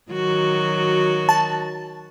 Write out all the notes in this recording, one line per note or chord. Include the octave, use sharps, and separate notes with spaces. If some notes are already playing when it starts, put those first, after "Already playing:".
D#3 F#3 F#4
A5